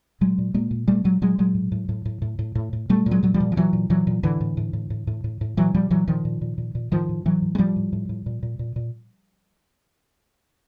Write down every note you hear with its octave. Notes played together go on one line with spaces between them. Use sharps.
A#2 F#3 G#3
A#2
A#2 G#3 A#3
A#2
A#2 G3 A3
A#2 F#3 G#3
A#2 F#3 G#3
A#2 F#3 G#3
A2
A2
A2
A2
A2
A2
A2
A2
A#2 G3 A3
A#2
F#3 G#3
A#2 F#3
F3 G3
A#2
F3
A#2 E3 F#3
A#2
A#2 E3 F#3
A#2
A2 D3 E3
A2
A2
A2
A2
A2
A2
A2
A#2 E3 F#3
A#2 F3 G3
A#2 E3 F#3
A#2 D#3 F3
A#2
A#2
A#2
A#2
A2 D#3 F3
A2
A2 E3 F#3
A2
G#3
A2 F3 G3
A2
A2
A2
A#2
A#2
A#2
A#2